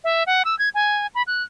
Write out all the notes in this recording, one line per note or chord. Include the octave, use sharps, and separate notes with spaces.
E5
F#5
E6
G#6
G#5
B5
F#6